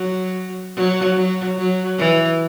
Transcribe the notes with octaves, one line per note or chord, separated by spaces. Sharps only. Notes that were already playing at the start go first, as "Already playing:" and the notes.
Already playing: F#3
F#3
F#3
F#3
E3